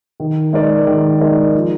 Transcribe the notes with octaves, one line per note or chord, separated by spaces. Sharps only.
D#3
G#3 D#4 A#4 D5
D#3
G#3 D#4 A#4 D5
F3